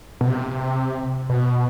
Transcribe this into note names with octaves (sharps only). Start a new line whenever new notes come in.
B2
C3
B2